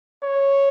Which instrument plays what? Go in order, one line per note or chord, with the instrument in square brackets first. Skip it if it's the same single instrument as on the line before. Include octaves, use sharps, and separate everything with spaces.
[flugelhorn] C#5